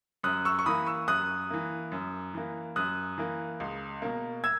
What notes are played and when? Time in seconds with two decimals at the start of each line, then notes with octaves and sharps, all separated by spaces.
0.24 F#2 D#6 F#6
0.45 C#6 E6
0.59 C#6
0.66 E3 A#3 B5 D#6
0.87 C#6 E6
1.08 F#2 D#6 F#6
1.50 E3 A#3
1.92 F#2
2.34 E3 A#3
2.76 F#2 D#6 F#6
3.18 E3 A#3
3.60 C#2
4.02 B2 A#3
4.44 E6 G#6